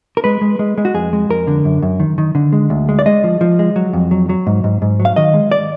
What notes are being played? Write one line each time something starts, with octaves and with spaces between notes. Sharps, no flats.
A#4
G#3 B4
G#3
G#3
G#3
F#4
F2 G#4
G#3
F2 A#4
D3
F#2
F#2
D#3
D#3
D3
G#3
D2
G#3
D5
G#3 D#5
F3
F3
G#3
F#3
F2
F#3
F#3
G#2
G#2
G#2
F#3
F5
D#3 D#5
G#3
D5